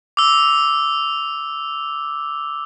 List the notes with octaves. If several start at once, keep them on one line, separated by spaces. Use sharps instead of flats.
D6 E6